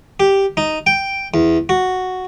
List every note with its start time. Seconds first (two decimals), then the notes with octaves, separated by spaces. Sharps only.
0.20 G4
0.57 D#4
0.87 G5
1.34 E2
1.69 F#4